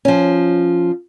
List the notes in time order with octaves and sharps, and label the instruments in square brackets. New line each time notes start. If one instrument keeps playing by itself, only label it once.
[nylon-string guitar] F3 C#4